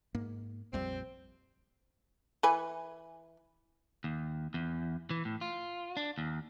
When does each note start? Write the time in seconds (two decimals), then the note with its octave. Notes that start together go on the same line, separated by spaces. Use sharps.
0.15 G#2 A#3
0.73 A#1 F2 G3 C4
2.43 E3 B4 G#5
4.04 D#2
4.54 E2
5.10 E3
5.25 A2
5.41 F4
5.97 D4
6.18 D#2